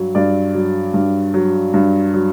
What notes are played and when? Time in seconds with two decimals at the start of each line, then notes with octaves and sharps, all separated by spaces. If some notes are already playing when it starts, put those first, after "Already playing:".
Already playing: G2 F#3
0.15 G2 D5
0.55 F#3
0.94 G2
1.34 F#3
1.74 G2
2.14 F#3